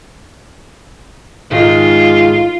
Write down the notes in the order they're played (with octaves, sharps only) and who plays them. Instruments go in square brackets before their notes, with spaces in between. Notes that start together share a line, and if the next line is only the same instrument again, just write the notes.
[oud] G#2 D#3 G#3 [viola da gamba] F4